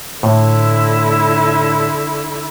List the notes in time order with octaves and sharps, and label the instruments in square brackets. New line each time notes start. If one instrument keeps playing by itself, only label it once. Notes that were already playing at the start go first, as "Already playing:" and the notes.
[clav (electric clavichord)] A2 [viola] D3 E4